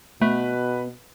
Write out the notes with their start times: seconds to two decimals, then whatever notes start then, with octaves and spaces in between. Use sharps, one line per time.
0.22 B2 A3 B3 B4